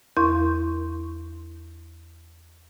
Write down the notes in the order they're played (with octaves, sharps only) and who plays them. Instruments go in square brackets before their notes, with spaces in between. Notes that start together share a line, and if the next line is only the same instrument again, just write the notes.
[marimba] E2 E4 A#4 C6 C#6 G6